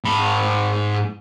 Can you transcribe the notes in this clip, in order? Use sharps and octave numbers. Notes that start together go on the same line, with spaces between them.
G#2 B5